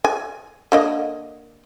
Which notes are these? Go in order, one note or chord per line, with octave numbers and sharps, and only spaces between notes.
G#5
D3 A#3 D#5